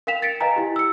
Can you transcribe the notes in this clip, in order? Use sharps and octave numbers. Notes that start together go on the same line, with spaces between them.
A#4 F5 G5 B6 E7 F7
A6 B6 C#7 D7
B4 D#5 F5 G5 G#5 A#5
E4 G4
E6 C#7